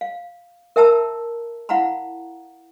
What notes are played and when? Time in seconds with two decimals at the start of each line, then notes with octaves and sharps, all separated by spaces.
0.01 F5
0.76 A#4 E5 G5 A5 A#5 E6
1.69 E4 F5 F#5 A#5 B5